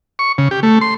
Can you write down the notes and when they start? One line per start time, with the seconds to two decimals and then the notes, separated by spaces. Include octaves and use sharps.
0.19 C#6
0.38 C#3
0.51 G4
0.63 A3
0.81 C6